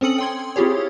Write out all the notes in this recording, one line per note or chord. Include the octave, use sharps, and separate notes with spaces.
C4 C#4 A4 D#6 C#7 F#7
G5 C6 G#6
C4 E4 F4 G4 G#4 C#5